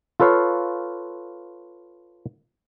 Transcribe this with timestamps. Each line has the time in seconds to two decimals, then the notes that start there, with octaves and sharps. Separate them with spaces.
0.20 F4 A4 B4 C#5 F5